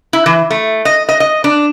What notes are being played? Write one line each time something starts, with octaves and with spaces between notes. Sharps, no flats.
E4
E3
A3
D#5
D#5
D#5
D4